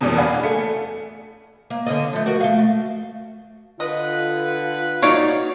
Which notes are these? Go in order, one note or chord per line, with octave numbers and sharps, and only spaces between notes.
F2 B2 E3 G3 A#3 C#4
D4 F#4 F5 G#5 B5
A3
A#3
D3 C#4 D#5
F3 A3
F#4 A#4
A3 F5
D3 F4 B4 D#5
D#4 F#4 C#5 D5 F5